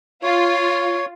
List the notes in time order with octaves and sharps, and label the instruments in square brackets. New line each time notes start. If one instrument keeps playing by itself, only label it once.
[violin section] F4 [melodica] C#5